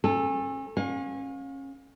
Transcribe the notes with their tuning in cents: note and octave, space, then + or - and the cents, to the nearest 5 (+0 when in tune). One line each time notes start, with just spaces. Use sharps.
C#4 -35 A4 +0
C#4 -25 F5 +35